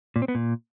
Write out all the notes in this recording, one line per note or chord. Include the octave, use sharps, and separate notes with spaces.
A#2
C4
B3
A#2